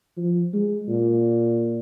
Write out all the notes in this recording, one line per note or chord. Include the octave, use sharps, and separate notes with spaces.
F3
G#3
A#2